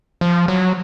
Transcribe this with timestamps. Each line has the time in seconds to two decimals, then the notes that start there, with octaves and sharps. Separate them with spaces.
0.21 F3
0.48 F#3